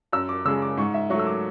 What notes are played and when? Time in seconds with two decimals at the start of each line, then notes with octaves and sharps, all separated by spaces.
0.13 F#2 E6
0.29 D6
0.45 C#3 G#3 E6
0.62 D6
0.77 G#2 C#6
0.94 E5
1.10 F#3 C#6
1.14 A3
1.19 E6
1.27 D6